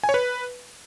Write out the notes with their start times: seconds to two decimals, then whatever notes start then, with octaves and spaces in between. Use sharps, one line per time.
0.03 G#5
0.09 C#5
0.14 B4